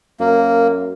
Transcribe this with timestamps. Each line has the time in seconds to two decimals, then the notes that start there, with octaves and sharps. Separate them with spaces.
0.20 F#2 A#3